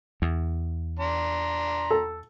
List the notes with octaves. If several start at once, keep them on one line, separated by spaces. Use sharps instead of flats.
E2
D4 A#5 C6
A4